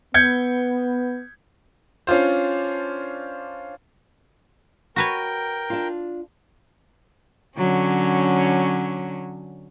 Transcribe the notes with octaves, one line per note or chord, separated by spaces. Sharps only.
B3 G6 G#6 C#7
C#4 D4 F4 C5
F#4 A#4 B4 C#5 G5
D4 F4
D3 F#3 C#4